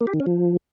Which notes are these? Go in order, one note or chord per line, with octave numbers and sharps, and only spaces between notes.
A#3
G4
D#3
C#4
F3